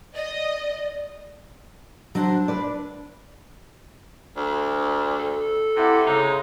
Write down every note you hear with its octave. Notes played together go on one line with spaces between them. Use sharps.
D5 D#5
F#3 D4 C5
B4 D5
D2
A4
C3 E4 F#5 D6
C#3 G#3 D#4